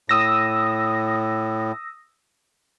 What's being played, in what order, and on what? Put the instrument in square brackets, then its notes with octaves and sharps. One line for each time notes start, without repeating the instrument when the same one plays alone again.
[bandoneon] A2 [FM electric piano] D#6 E6 A#6